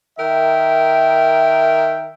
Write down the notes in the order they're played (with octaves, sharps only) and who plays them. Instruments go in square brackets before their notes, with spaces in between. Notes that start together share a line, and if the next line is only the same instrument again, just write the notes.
[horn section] D#3 A#4 E5 G5